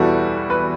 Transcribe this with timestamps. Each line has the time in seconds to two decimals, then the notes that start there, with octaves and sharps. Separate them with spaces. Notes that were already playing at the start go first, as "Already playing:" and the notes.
Already playing: E2 B2 G3 E4 F#4 A4
0.50 B4